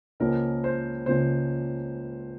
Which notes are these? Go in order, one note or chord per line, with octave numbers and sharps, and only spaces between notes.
C#2 C#3 F3 A#3 C#4 A#4
C5
C#2 C#3 F3 A#3 C#4 C5